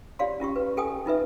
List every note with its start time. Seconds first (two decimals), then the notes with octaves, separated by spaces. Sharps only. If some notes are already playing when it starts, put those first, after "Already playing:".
0.19 F4 G4 C#5 D5 F5 C6
0.40 C#4 F4 G4 C#6
0.56 B4
0.77 G4 A4 G5 G#5 D#6
1.06 D#4 F4 B4 E5